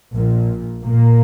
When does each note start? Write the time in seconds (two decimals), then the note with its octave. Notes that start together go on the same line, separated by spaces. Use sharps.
0.14 A#1 A#2
0.85 A#2 A#3